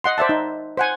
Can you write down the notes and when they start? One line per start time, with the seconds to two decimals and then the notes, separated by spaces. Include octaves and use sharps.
0.04 D#5 F#5 C6
0.18 C5 D5 E5 A5
0.29 D#4
0.77 C5 F#5 G#5